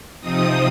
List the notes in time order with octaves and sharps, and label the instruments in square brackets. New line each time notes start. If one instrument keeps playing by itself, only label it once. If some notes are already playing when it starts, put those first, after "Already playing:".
[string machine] C3 F3 C4 D#4 D#6